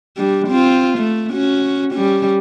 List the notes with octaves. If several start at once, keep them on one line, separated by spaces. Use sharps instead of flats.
G3 D4
C4 F4
A3
C#4 F#4
G3 C#4